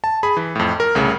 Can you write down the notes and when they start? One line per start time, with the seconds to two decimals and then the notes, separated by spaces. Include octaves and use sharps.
0.04 A5
0.23 G#4 B5
0.37 E3
0.55 F2 A2
0.80 A#4
0.95 C2 A2 C#3